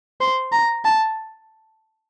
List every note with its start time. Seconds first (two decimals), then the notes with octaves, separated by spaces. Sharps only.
0.21 C5
0.53 A#5
0.85 A5